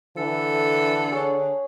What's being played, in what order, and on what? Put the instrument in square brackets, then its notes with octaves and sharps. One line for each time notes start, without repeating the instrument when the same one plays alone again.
[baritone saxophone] D3 [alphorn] E3 [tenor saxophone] A4
[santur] G#4 C#5